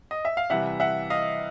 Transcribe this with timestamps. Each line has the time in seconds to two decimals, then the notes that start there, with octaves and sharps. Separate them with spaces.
0.11 D#5
0.25 E5
0.37 F5
0.50 C3 E3 G3 E5 F#5
0.80 E5 F#5
1.10 D#5 F5